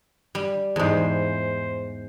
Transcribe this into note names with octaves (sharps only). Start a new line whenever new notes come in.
G3
E2 G#2 C5